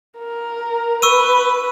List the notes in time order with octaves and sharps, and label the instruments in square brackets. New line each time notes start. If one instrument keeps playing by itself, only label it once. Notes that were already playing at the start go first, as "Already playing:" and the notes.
[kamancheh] A#4
[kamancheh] B4 [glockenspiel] C#6 E6 D#7